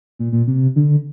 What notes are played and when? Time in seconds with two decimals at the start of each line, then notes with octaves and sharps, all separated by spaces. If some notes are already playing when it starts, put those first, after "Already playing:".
0.19 A#2
0.32 A#2
0.47 C3
0.76 D3